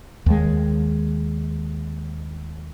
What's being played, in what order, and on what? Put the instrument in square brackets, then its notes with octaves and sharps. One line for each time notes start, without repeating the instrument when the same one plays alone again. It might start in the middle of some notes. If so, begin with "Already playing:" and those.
[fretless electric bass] D#2 G#3